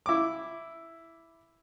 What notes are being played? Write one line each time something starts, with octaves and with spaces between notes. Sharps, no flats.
E4 D6